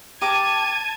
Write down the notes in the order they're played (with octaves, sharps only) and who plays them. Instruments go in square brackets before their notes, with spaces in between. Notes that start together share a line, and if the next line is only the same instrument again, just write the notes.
[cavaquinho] G4 A#4 D6 [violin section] A5 G#6 [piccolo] D#7